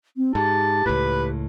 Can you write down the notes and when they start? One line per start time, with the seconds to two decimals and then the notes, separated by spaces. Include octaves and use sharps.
0.16 C4
0.35 G#2 G4 A5
0.86 C#2 A2 B4